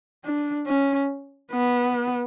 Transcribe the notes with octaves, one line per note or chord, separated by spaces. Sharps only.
D4
C#4
B3